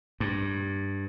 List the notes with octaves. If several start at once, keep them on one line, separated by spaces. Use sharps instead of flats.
G2